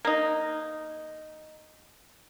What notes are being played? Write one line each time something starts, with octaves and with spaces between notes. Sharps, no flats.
A#3 D#4